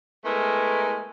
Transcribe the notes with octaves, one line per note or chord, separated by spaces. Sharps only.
G#3 A3 B3 E4 A#4